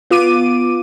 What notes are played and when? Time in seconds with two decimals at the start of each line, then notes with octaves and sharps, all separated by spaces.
0.10 B3 F4 D6 D#7